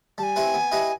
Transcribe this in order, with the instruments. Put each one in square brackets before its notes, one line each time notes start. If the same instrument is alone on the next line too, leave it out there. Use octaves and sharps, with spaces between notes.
[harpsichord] G3 [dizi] A5
[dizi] G#5
[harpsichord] C4 E4 G4 B4
B3
E4 G4 B4 D#5